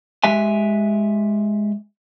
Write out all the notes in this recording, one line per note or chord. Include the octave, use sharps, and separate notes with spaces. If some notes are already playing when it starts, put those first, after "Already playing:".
G#3 G4 E5 G#5